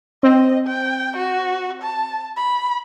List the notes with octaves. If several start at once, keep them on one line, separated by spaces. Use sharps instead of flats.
C4 D#5
G5
F#4
A5
B5